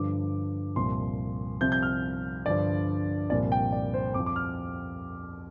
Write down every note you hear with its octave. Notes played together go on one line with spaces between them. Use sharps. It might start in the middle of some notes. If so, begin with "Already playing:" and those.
Already playing: G2 D3 F3 D6
C2 A#2 F3 C6
C2 C3 F3 G6
G6
F6
G2 D3 F3 D5
C2 A#2 F3 D5
G5
D5
C5
F2 F3 D6
D6
F6